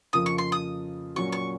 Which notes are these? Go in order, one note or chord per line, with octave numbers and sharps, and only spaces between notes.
F2 C#3 F3 A#3 D#6
C#6
C6
D#6
A#2 F#3 C#4 F#4 C#6
C#6